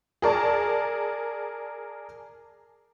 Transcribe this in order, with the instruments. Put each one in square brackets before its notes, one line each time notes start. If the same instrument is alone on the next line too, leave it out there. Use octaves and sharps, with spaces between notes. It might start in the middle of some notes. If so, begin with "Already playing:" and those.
[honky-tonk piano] G#4 A#4 D5 A5